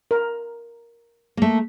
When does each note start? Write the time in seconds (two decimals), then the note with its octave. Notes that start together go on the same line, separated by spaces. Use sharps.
0.11 A#4
1.37 A3 A#3